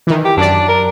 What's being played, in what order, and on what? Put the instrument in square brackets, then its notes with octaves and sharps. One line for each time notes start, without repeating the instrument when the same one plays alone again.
[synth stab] D#3 E3
[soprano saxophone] G4
[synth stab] F#2 D5 [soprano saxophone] D4
[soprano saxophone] A#4